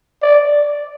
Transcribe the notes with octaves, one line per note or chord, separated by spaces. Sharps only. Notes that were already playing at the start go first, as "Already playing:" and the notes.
D5